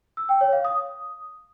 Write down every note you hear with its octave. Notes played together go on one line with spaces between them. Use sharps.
E6
G5
C#5
F5
D#6